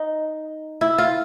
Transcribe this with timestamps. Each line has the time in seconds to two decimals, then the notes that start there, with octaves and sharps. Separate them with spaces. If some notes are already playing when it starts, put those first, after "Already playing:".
Already playing: D#4
0.81 E4
0.98 F4